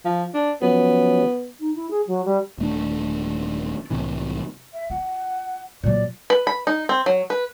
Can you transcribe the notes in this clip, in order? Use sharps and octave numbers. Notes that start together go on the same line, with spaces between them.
F3
D4
F3 F#3 B3 C#4
D#4
E4
G#4
F#3
G3
D#1 A3 D4
C2 A2 C3 E3
E5
F4 F#5
A#2 F#3 D5
B4
B5
D#4
C4
F#3
B4